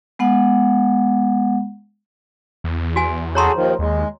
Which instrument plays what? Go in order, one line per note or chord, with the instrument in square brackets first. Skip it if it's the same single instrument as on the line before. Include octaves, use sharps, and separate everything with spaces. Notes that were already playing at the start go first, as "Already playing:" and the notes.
[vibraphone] G#3 B3 F#5
[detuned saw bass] E2
[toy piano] F#4 G#5
[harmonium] F#4 G#4 A4 [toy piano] C#5 A#5 C6
[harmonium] D#2 D#3 F3
[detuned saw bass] D#2 [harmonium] G#3